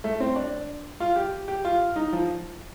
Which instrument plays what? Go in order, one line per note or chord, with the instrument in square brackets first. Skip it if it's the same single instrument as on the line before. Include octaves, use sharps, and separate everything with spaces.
[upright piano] A3
C4
D4
F4
G4
G4
F4
D#4
F3